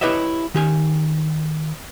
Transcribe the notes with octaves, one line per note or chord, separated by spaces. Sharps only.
E4 G4 B4 C#5 D#5 E5
D#3 G4 G#5